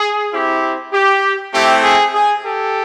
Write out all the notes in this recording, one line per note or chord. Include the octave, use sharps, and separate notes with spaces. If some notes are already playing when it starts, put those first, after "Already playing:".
Already playing: G#4
C4 E4 G4
G4
A3 C4 E4 G4
G#4
G#4
G4 A4